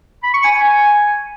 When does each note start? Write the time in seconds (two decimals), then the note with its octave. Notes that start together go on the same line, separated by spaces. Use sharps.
0.23 B5
0.34 C#6
0.44 G#5
0.54 G#5